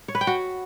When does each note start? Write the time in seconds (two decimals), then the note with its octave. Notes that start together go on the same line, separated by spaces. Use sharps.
0.08 C#5
0.15 B4
0.21 G5
0.27 F#4